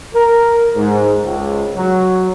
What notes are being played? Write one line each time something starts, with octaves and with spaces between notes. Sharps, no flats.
A#4
G#2
C#2
F#3